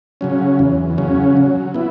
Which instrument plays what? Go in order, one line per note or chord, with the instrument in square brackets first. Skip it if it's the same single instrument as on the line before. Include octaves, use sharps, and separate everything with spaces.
[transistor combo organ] C#3 F#3 C#4
E2
C#3 F#3 C#4
F#3
B3 E4